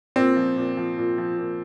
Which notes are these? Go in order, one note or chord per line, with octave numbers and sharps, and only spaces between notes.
A#2 C4
F3
A#2
F3
A#2
F3
A#2